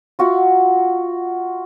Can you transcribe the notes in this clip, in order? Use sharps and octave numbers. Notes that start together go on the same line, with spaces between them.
F4 F#4 E5 F#5